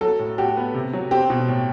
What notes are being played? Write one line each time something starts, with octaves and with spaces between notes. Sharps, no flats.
F#3 A4
A2
F#4 G4
B3
C3
F#3
C4 G4
B2
A2